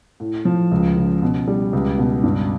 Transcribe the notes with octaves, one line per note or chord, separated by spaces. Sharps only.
A2
F3
C#2
C#3
B2
G3
C#2
B2
G2